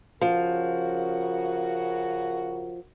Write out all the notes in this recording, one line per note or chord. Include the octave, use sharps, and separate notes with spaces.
C#3 F3 F#4 A#4